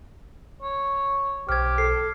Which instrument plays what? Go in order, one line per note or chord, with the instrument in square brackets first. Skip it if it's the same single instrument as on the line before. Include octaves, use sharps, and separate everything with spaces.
[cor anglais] C#5
[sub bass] B1 [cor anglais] G4 [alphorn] C5 [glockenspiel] F6 G#6
[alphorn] A4 [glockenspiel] C7